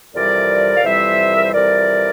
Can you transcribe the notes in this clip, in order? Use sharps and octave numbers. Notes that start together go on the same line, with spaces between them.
F2 C3 E3 G3 A#4 D5
F5
F2 C3 E3 G3 C5 E5
A#4
C5
F2 C3 E3 G3 A#4 D5